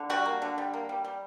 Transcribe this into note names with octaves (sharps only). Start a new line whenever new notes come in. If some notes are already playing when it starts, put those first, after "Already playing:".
Already playing: D3
G3 F#4
A#3
D3
G3
A#3
G3
G3